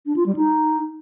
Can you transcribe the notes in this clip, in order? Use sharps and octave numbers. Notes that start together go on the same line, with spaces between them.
D4
F4
G3
D#4